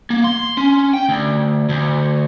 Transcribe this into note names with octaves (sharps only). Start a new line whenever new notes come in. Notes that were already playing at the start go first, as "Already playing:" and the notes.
A#3
C6
C#4
G5
D2
D2